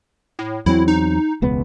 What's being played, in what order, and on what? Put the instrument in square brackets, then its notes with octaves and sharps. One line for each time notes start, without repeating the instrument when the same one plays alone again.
[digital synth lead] A2
[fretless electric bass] E2 F#3 C4 [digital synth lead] E4
[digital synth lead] D#4
[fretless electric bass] E1 C#2 B3